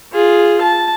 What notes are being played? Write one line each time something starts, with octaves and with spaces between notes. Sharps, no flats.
F4 G#4
A5